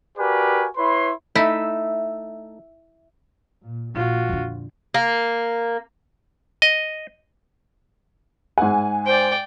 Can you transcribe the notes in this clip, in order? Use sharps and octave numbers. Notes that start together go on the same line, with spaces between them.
F#4 G4 A#4 B4 D5 G#5
E4 B4 C#5 C6
A3 D#4 E4 E5
A#2
A#1 A#2 F4 F#4
F2 D3
A#3
D#5
G#2 F#5 G#5
C5 D5 G5